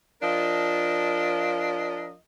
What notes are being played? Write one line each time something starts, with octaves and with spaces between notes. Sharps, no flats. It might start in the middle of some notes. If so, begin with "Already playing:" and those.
F3 D4 F4 A#4 D#5